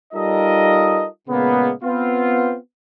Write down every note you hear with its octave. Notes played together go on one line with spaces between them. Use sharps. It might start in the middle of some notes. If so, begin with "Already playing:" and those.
G3 D#4 F4 A4 A#4 D#5
A#2 C#3 G#3 A#3 B3
B3 C4 F4